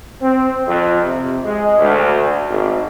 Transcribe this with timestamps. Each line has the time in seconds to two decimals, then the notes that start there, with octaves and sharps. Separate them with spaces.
0.21 C4
0.67 F2
1.02 C3
1.43 G#3
1.78 D2
2.48 G#1